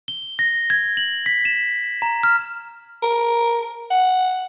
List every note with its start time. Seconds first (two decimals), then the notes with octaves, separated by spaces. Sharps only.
0.08 G7
0.39 A#6
0.70 G#6
0.97 F#7
1.26 B6
1.45 E7
2.02 A#5
2.23 F6
3.03 A#4
3.91 F#5